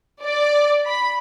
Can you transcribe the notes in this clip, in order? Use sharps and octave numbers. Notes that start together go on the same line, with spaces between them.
D5
B5